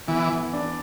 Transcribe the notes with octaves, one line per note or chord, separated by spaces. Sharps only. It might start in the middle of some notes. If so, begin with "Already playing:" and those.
E3 B3
E3
D4